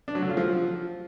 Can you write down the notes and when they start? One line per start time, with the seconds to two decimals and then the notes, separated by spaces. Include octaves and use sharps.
0.08 D4
0.15 F#3
0.22 D3
0.30 F4
0.37 F3